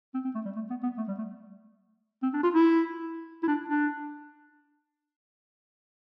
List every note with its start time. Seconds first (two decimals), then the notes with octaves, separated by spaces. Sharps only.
0.14 C4
0.25 C4
0.35 A3
0.45 G3
0.56 A3
0.70 B3
0.83 B3
0.98 A3
1.08 G3
1.18 A3
2.23 C4
2.34 D4
2.43 F4
2.54 E4
3.43 E4
3.48 D4
3.69 D4